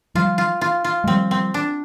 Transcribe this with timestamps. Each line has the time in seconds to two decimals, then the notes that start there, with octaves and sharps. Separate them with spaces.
0.15 F3 G3 F4
0.38 F4
0.61 F4
0.84 F4
1.04 G#3
1.07 F3 G3 C4
1.31 C4
1.54 D4